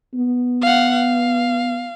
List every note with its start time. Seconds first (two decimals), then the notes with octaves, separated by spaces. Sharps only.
0.14 B3
0.62 F5 F#5
0.93 F5